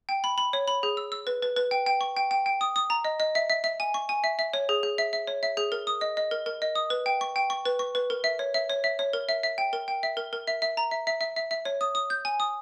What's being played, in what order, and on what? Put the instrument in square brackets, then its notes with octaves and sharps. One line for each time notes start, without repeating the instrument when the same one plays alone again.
[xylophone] G5
B5
B5
C#5
B5
G#4
E6
E6
B4
B4
B4
G5
G5
C#6
G5
G5
G5
D#6
D#6
A#5
D#5
D#5
E5
E5
E5
G#5
C#6
G#5
E5
E5
C#5
G#4
G#4
E5
E5
C#5
E5
G#4
A#4
D#6
D#5
D#5
A#4
A#4
D#5
D#6
B4
G5
C#6
G5
C#6
B4
C#6
B4
A#4
E5
C#5
E5
C#5
E5
C#5
A#4
E5
E5
G5
A#4
G5
E5
A#4
A#4
E5
E5
A#5
E5
E5
E5
E5
E5
C#5
D#6
D#6
G6
G#5
D#6